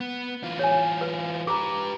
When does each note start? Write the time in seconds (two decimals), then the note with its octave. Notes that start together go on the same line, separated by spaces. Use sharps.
0.01 B3
0.44 E3 F4
0.59 C#5 G#5
1.01 B4
1.47 G4 B4 A#5 D6